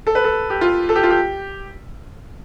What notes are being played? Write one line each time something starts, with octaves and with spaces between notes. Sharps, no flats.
A4
B4
A4
G4
F4
A4
G4
F4
G4